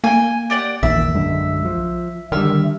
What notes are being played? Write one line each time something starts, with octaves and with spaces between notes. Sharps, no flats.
A#3 G5 G#5
G4 D5 F#5
A#1 E2 A#2 D#3 E5
F#2 D3 G#3
F3
D3 D#3 G3 E5 F6